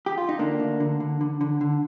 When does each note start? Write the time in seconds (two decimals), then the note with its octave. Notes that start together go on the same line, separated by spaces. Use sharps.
0.06 G4
0.18 F4
0.29 D#4
0.39 D3 A#3 D4
0.60 D2
0.80 D3
1.00 D3
1.21 D3
1.41 D3
1.61 D3